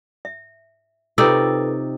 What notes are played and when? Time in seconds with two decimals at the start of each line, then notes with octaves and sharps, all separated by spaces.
0.25 E5
1.18 C3 D#4 F4 A4 B4 D5 G5 E6